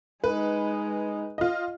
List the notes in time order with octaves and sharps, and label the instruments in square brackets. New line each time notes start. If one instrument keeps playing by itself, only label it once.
[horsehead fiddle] G#3 D#4 [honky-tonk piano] B4
[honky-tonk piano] F4 D#5